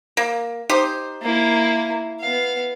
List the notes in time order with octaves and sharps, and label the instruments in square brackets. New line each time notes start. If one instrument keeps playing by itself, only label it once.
[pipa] A#3
D#4 G4 C5
[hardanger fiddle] A#3 E4
B3 F5